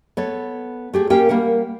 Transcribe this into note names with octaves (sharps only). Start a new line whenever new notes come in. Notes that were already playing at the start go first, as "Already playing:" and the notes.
B3 A4 C#5
A3 G4 G#4
A#3 C#4 G4 A#4 F5 G5
G3 A#3 A#4 F#5